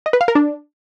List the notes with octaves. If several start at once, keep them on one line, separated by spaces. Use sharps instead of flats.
D#5
B4
F5
A#4
D4